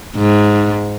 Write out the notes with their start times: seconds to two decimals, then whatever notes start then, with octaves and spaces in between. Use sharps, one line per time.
0.17 G#2